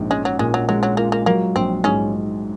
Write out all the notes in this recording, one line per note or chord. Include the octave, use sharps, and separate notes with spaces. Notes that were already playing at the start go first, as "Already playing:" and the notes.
Already playing: A#1 G#2
G#3 C#4
F#3
A#2 G#3
F#3
F#3 G#3
F#3
A#3 F4
A#3
F#3 A#3
A#1 C4
G#2 C#3 C#4